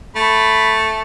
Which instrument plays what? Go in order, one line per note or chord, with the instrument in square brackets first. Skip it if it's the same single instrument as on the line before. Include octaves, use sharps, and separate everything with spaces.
[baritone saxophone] A3 [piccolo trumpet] B5